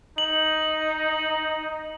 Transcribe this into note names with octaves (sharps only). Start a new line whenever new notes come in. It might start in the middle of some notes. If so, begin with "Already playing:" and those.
D#4 F#7